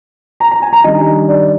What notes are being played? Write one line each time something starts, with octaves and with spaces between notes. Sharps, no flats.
A#5
A#5
G#5
A#5
D#3 G3 D4 D#5
D5